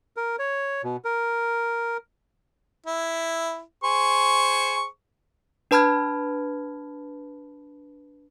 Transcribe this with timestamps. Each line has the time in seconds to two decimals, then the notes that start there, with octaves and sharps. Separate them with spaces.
0.17 A#4
0.39 C#5
0.84 B2
1.05 A#4
2.86 E4
3.84 G#4 C5 C#6
5.71 D4 B4 A5 B5 F6 G#6